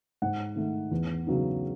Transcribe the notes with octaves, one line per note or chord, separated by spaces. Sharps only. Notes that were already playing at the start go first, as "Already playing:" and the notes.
G#2 F#5
D#3 A3
E2
C#3 F#3 B3 D#4